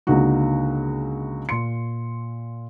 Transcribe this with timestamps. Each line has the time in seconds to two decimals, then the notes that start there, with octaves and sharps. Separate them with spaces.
0.07 C#2 D3 A#3 D#4 F#4
1.49 A#2 C6 C#7